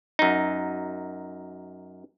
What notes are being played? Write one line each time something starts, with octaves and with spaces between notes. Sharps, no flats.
F#2 D#4